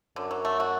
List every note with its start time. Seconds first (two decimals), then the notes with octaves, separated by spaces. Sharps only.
0.16 F#2 D3
0.31 F#3
0.45 A3
0.60 F#4